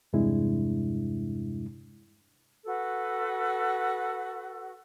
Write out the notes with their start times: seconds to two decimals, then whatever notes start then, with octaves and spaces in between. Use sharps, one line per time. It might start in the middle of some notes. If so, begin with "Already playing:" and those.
0.13 E2 G2 C3 G#3 D4 E4
2.65 F#4 A4 B4